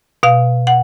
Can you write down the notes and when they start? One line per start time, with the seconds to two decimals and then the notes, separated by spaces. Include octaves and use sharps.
0.23 B2 F5
0.67 F#5